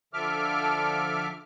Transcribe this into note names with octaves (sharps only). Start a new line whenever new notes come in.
D3 F3 A4 E5 D6 F6